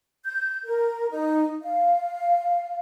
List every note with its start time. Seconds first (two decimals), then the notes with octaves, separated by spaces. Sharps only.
0.25 G6
0.65 A#4
1.11 D#4
1.62 F5